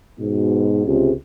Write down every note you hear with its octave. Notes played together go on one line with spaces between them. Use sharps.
G#2 B2
C#2 C3